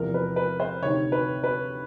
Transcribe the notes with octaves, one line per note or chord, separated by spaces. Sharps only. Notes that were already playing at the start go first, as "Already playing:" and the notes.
Already playing: E2 C3 F3 A#4
B4
B4
C5
D2 C3 D#3 C#5
B4
B4